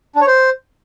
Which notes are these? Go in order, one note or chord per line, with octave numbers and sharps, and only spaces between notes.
D4
C#5
C5